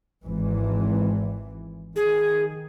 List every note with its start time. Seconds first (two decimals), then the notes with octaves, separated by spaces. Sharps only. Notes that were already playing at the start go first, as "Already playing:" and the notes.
0.24 G#1 E3
1.96 D#3 G#4